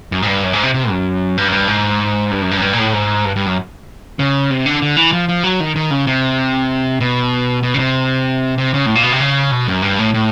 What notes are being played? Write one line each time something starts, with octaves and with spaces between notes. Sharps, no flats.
F#2
G#2
G2
F#2
G#2
C3
C3
F#2
G2
F#2
G2
G#2
G2
F#2
G2
F#2
G2
A#2
A2
G#2
G2
G2
F#2
C#3
C3
D3
D3
E3
F3
F3
F#3
D#3
D#3
C#3
C3
B2
B2
C#3
C3
C3
C#3
A2
A#2
B2
C3
C#3
B2
F#2
G2
A2
A2